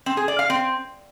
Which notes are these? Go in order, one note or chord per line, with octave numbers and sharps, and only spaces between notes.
C4
G#4
D5
F5
C4